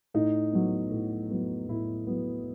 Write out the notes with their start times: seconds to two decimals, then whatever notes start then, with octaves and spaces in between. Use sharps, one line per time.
0.14 A2 D#4
0.52 F#3 B3
0.91 A2
1.31 F#3 B3
1.69 A2 E4
2.07 F#3 B3